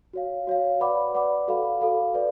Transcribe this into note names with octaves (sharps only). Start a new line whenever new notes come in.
F#4 C#5 F5
F#4 C#5 F5
B4 D5 F#5 B5 D6
B4 D5 F#5 B5 D6
F#4 A4 F5 B5
F#4 A4 F5 B5
B4 D5